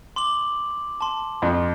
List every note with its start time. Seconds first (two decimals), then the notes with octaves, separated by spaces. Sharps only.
0.16 C6 D6 F#7
1.01 A5 C6
1.42 F2